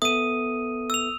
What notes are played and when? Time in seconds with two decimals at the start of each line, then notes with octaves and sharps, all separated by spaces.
0.02 B3 A4 E5 D#6 D#7
0.90 E6 F7